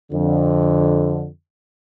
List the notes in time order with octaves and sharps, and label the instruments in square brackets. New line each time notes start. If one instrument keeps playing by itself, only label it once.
[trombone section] F2 D3